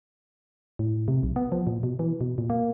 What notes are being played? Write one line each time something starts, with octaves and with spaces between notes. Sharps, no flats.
A2
C3
B1
B3
F3
A#2
B2
E3
B2
A#2
A#3